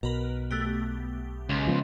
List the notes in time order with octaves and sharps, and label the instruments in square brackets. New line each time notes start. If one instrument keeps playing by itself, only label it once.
[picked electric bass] B1 [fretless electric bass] B2 [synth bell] A#4 B4
[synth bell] A3 B3 G4
[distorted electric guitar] C#2
[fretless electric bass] F3 A#3 B3